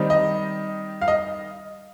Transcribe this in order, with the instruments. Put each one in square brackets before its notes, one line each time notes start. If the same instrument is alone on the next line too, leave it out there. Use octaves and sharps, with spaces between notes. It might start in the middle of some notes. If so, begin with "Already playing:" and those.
Already playing: [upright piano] D#3 G3 C4 D#4
D#5
F5
D#5